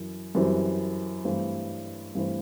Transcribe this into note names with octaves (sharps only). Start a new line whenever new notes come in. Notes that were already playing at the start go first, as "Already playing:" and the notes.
Already playing: F#2 E3
F#2 E3 G3 C4
G2 E3 A3 C4
G2 E3 A3 C4